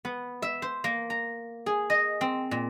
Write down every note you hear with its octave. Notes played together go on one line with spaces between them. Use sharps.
B3
E5
C5
A#3
A#5
G#4
D#5
C4
A#2